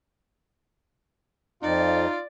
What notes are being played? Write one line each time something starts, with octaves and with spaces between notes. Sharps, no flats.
F2 D#4 F4 D5